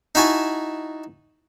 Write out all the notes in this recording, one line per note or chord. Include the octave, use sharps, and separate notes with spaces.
D#4 E4 F#4 G#5 A5